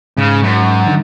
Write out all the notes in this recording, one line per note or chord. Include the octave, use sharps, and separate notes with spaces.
G#2 C#3
F#2
D3 D#3